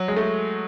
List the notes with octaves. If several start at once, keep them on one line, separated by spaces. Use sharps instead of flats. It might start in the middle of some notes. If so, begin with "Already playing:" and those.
Already playing: F#3
G#3
A3